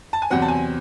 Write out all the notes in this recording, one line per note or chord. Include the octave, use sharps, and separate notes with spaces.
A5
G#5
E2 C3 F#3 C4 F#5
A5
G#5